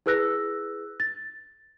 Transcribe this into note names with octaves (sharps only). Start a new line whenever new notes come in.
E4 G#4 B4 E6 F#6 A#6
A6